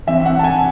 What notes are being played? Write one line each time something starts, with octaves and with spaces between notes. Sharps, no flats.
E3 C4 E5
F#5
A5
G#5